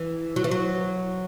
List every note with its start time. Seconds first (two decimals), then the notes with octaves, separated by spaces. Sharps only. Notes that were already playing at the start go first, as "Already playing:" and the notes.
Already playing: E3
0.36 F#3
0.44 E3
0.51 F#3